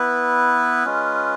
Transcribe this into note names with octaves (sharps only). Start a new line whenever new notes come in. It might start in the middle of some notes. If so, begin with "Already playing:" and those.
Already playing: B3 E4 B4
G#3 C#4 F4